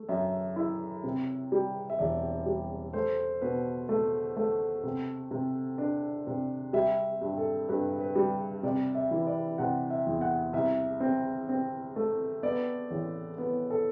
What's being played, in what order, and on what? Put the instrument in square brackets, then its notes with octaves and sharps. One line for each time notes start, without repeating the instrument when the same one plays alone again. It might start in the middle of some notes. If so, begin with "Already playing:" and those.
Already playing: [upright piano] A3
[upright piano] F#2 [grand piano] E5
[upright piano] E4
C3
G3
[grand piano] E5
[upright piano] E1 [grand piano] D5
[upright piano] G3
[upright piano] A3 [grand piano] C5
[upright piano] B2 [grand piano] B4
[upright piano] A3
A3
C3
C3
D4
C3
[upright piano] G3 [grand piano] E5
[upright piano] G2
[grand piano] A4
[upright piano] G2 [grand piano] B4
[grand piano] B4
[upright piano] G3
[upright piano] C3 [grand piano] D5
[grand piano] E5
[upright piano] E3
[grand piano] D5
[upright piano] C3 [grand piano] F#5
[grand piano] E5
[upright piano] E2
[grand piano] F#5
[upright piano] C2 [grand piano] E5
[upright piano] C4
C4
A3
[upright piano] B3 [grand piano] D5
[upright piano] A1
B3
[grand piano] A4